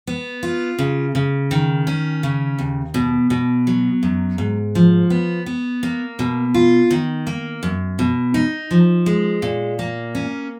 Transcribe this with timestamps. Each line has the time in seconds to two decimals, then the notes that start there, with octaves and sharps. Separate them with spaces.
0.07 B3
0.43 F4
0.79 C#3
1.15 C#3
1.51 D#3
1.87 C#4
2.23 C#3
2.59 D#2
2.94 B2
3.30 B2
3.67 F#3
4.03 F#2
4.38 G#2
4.75 F3
5.10 B3
5.46 B3
5.83 A#3
6.19 B2
6.54 F4
6.91 D#3
7.27 A#3
7.63 F#2
7.99 B2
8.34 D#4
8.71 F3
9.06 G#3
9.42 A#2
9.79 A#3
10.15 C#4